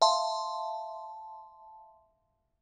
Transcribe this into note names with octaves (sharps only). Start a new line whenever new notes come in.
E5 F5 A5 C6